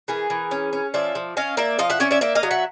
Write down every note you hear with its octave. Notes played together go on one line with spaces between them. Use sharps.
E3 G#4 A#4
E3
C#4
C#4
F3 D5 E5
F3
C#4 D#5 F5
A#3 D5 E5
F3 D#5 F5
E5 F#5
C#4 D5 E5
D5 E5
A#3 D5 E5
D#5 F5
F#3
E5 F#5